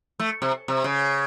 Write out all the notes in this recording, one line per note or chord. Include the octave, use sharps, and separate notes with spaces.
A3
C3
C3
C#3